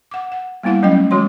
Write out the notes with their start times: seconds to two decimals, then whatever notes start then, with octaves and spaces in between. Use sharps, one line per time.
0.11 F#5 D6
0.32 F#5
0.63 G3 A#3 B3 E4 F5 F#5
0.83 F#3 A3 C#4 D#5 G5
1.11 E3 G#3 F#4 C#5 C6